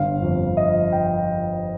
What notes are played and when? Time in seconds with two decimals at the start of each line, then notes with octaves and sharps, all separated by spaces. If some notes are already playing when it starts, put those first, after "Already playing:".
Already playing: G1 F5
0.22 F2
0.57 F3 D#5
0.92 G5